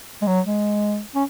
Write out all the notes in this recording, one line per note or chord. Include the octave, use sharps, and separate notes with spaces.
G#3
F#3
G#3
C#4